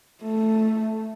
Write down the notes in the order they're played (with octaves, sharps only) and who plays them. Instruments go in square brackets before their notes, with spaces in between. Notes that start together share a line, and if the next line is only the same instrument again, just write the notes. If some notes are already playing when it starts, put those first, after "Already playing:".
[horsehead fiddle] A3